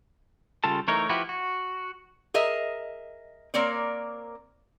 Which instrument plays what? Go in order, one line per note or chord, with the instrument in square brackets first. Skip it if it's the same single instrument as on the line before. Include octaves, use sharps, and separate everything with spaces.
[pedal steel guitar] C#3 G3 F4 A4 A5
E3 A3 D#4 A#4 C#5
F3 E4 F#4 G4 B4
F#4
[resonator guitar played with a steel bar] G#4 A#4 D#5 E5
A#3 C4 A#4 C#5 D5